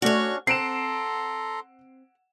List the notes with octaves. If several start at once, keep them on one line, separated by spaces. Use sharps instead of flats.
A3 C#4 D4 F#4 C#5 D5
C4 A4 F#5 A#5 C6 C7 D7 E7